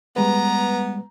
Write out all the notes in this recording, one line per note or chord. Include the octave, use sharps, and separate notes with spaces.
G3 G#3 B3 B4 A#5